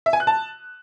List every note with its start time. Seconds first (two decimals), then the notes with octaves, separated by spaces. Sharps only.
0.06 E5
0.13 G#5
0.20 F#6
0.27 A5